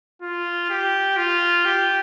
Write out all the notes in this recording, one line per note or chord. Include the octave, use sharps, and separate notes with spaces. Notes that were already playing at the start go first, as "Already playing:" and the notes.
F4
G4
F4
G4